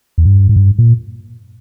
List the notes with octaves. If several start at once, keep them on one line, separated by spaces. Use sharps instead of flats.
E2
G2
G#2
G2
A#2